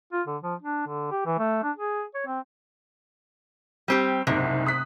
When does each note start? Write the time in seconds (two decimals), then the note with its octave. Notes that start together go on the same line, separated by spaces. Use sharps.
0.13 F4
0.27 D3
0.43 F3
0.62 D4
0.87 D3
1.12 G4
1.26 E3
1.39 A3
1.63 D4
1.76 G#4
2.15 C#5
2.27 C4
3.88 G3 C4 G4
4.27 F#1 C2 G#2 C3
4.66 D#6 F#6 B6